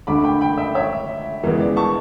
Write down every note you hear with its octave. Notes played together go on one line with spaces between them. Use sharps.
D2 D3 A3 B5 D6
G5 B5
G5 B5
E5 G5
C#5 E5
C#2 C#3 E3 B3
D5
A5 C#6